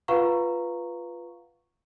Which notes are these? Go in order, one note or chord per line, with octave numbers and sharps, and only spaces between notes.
F4 B4 F5 F#5 A#5 C#6